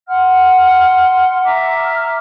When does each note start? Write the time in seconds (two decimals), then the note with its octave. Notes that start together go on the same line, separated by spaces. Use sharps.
0.08 F#5 C6 F6
1.43 E5 A#5 D6 F6